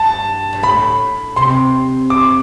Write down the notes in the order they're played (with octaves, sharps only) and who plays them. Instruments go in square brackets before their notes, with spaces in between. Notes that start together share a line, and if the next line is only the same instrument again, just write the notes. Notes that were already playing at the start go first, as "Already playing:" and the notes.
Already playing: [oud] G2 [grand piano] A5
[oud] G2
[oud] A2 [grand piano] B5
[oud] C3 [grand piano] C6
[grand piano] D6